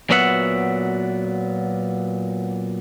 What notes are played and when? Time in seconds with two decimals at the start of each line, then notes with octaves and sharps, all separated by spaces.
0.10 A#2 F#3 B3 F#4 E5 F#5